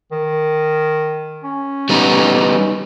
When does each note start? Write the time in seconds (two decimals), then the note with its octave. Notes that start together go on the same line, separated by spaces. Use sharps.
0.12 D#3
1.43 C#4
1.89 G3 B3 D#4